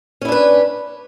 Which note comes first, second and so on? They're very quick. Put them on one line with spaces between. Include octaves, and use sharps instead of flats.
C#4 E4 D4 B4